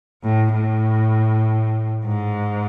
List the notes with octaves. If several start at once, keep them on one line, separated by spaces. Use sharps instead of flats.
A2
A2
G#2